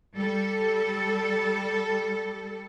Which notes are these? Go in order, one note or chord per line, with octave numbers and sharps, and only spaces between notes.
G3 A4